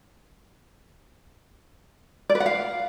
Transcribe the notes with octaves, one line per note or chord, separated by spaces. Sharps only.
D5
B4
F#5
F5